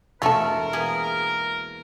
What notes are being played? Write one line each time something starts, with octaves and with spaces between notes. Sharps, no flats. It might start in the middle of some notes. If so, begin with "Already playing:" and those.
E1 A3 F4 F#4 A4 A#4 E5 E7
A#3 B3 G#4 E5